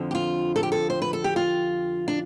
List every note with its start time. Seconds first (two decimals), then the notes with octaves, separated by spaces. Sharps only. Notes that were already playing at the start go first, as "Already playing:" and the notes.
Already playing: F2 D3 F3
0.11 G4
0.15 F4
0.56 A4
0.63 G4
0.72 A4
0.90 C5
1.02 B4
1.13 A4
1.24 G4
1.36 F4
2.08 D4